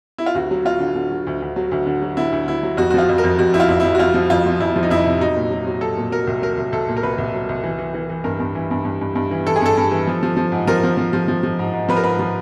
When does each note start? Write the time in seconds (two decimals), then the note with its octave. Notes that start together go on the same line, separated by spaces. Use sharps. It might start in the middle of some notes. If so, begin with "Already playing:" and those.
0.18 E4
0.26 F4
0.35 D2 F#4
0.51 F#3
0.65 F#3 F4
0.80 D3
0.96 D3
1.11 F#3
1.27 D2
1.42 D2
1.56 F#3
1.71 D2
1.86 D3
2.02 F#3
2.17 D3 E4
2.32 D2
2.47 D2 E4
2.63 F#3
2.77 F2 F#4
2.91 F#4
2.94 F3 F4
3.09 F2
3.18 A#4
3.23 F2
3.39 F2 F#4
3.54 F2 E4
3.60 F4
3.69 F2
3.80 F2 E4
3.95 F#4
3.99 F2 F4
4.14 F3
4.30 F2 F4
4.46 F3
4.60 F2 E4
4.76 F3
4.83 D#4
4.90 F2 E4
5.05 C3
5.21 F#3 D#4
5.36 A#2
5.51 F#3
5.67 F#3
5.81 F#3 A4
5.97 A#2
6.12 F#3 A#4
6.27 C2
6.42 F#3 A#4
6.57 C2
6.72 C2 A4
6.88 A#2
6.97 A#4
7.03 C2 B4
7.18 C2
7.34 F#3
7.49 C2
7.64 E3
7.79 E3
7.94 E3
8.09 E3
8.24 G2 A#4
8.40 G2
8.55 E3
8.71 G2
8.85 G2
9.01 G2
9.15 G2
9.31 E3
9.47 E3 A4
9.56 G#4
9.62 G2 A4
9.77 G2
9.91 E3
10.07 F3
10.23 F3
10.37 F3
10.52 G#2
10.67 F3 A#4
10.83 F3
10.97 F3
11.13 F3
11.28 F3
11.43 F3
11.59 G#2
11.73 G#2
11.89 F3 B4
11.97 A#4
12.03 G#2 B4
12.19 F3